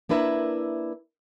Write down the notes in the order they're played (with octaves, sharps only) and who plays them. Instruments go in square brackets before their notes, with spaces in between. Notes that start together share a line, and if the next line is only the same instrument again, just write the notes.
[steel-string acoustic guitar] A#3 D4 E4 B4 E5 A#5